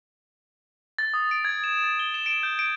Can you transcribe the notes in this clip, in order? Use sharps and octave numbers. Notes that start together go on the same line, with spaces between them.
A6
D#6
D7
G#6
E7
A6
G7
E7
D7
G6
D7